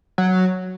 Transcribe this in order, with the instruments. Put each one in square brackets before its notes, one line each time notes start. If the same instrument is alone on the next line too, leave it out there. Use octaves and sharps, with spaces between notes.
[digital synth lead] F#3